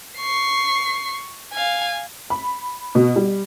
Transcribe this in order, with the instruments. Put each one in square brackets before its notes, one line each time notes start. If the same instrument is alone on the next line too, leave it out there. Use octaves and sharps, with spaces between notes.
[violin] C#6 C7
F5 G#5
[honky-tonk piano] B5
B2
G3